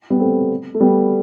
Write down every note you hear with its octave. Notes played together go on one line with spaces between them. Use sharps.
G3 B3
A3 C4
A3
G3 B3